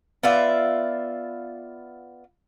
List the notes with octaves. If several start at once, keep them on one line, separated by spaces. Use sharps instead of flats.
B3 F4 D5 E5